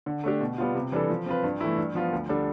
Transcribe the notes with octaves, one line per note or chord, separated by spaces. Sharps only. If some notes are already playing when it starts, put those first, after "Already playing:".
D3
A3 D4 G4
B2
G3 B3 F4
C3
E3 G3 D4 A4
F3
C4 F4 B4
G2
E3 A3 E4
G2
F3 B3 F4
D2
D3 G3 D4 A4